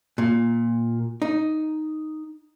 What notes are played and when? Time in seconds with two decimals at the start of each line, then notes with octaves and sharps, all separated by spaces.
0.18 A#2
1.22 D#4